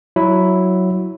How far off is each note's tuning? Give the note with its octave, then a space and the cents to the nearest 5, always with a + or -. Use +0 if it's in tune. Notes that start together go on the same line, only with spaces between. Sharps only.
F#3 +0 E4 +0